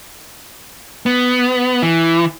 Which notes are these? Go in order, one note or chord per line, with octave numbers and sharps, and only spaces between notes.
B3
E3